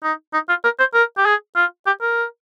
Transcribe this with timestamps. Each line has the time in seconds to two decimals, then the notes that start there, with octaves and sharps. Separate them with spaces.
0.03 D#4
0.33 D#4
0.49 F4
0.64 A#4
0.79 C5
0.94 A#4
1.18 G4
1.26 G#4
1.56 F4
1.87 G4
2.02 A#4